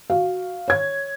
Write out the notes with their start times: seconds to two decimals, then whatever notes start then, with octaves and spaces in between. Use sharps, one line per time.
0.10 F#4 F5
0.68 C#5 G#6